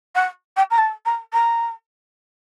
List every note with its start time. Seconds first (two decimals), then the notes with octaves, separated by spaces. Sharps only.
0.15 F#5
0.57 G5
0.71 A#5
0.78 A5
1.06 A#5
1.33 A#5